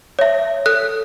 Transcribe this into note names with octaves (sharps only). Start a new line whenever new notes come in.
C#5 E5
A4 F#6